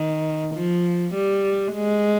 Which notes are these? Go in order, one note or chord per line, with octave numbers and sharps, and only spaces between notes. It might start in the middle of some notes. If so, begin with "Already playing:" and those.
Already playing: D#3
F3
G3
G#3